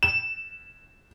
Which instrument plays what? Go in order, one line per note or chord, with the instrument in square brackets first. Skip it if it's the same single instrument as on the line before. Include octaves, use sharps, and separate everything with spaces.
[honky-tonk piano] E7